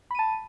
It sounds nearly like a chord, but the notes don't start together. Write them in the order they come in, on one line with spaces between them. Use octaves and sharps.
B5 D#7 A5